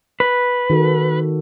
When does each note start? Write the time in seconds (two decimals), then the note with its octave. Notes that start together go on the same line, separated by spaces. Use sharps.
0.20 B4
0.70 D#3 F#4 A4